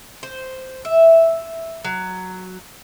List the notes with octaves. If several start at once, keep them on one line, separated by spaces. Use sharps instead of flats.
C5
E5
F#3